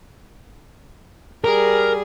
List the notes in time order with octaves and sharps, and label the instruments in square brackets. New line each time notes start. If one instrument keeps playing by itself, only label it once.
[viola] G3 G#4 [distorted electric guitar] A#4